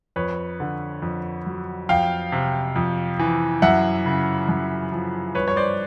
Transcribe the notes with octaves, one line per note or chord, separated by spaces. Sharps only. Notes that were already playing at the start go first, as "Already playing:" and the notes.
F2 B4 C#5
D3
F2
F#3
F2 F5 G5
C3
F2
E3
F#2 E5 F#5
C#3
F#2
F3
G2 B4 C#5
C#5
C5 D5